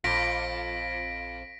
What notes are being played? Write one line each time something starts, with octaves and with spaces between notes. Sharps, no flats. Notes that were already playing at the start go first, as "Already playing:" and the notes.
A#1 F2 F4 A#6 B6 D7